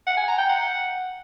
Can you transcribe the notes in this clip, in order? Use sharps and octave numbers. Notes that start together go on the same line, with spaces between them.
F#5
G#5
A#5
G5
F#5